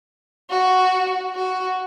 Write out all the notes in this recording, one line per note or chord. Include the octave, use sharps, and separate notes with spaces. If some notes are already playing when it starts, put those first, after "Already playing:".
F#4
F#4